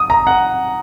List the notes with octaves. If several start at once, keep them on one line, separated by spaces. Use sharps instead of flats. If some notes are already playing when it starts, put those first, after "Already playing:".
Already playing: D#6
A#5
F#5